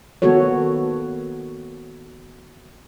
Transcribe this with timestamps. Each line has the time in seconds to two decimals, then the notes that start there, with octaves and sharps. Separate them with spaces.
0.22 D#3 A#3 B3 F#4 A4 C#5